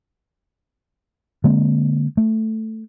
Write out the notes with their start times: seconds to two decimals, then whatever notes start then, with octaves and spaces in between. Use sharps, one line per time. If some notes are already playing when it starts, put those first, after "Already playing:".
1.44 D3 G#3 A#3 C4
2.17 A3